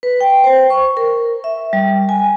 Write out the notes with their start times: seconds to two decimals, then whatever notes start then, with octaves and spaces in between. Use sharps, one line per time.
0.03 B4
0.21 G5
0.44 C5
0.70 C#6
0.97 A#4
1.44 E5
1.73 G3
2.09 G#5